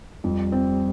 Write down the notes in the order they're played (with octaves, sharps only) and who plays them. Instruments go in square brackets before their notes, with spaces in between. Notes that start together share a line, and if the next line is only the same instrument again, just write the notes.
[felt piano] F2 [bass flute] G3
[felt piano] C4